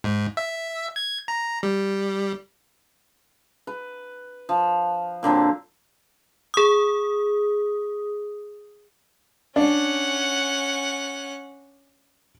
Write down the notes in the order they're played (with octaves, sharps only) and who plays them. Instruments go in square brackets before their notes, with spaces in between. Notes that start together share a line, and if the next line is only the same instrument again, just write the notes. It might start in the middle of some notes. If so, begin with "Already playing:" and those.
[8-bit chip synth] G#2
E5
G#6
A#5
G3
[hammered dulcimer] B4
F3
A#2 D3 F#3 C4
[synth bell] G#4 D#6
[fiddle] C#4 F#5 [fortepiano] D4